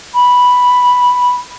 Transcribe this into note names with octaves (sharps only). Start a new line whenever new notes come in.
B5